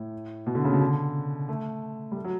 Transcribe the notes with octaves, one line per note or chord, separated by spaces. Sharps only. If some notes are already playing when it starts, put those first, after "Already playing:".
Already playing: A2
B2
D3
C#3
B2
D3
A3
G3
A3
F#3